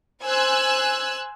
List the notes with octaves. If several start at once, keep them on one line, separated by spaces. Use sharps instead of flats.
C5 G#5 E6 F#6 G#6